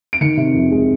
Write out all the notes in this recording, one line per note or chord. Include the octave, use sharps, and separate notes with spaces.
D7
D#3 C#7
C3
F2
G#3